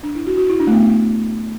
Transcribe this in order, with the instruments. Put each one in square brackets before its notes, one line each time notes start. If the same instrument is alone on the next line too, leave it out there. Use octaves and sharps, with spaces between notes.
[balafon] D4
E4
F#4
F#4
E4
D4
A3
B3